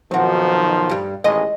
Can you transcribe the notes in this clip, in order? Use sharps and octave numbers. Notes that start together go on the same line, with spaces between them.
B1 D#3 F3 C4 F#4
G2 G3
A1 D#3 G#3 D#5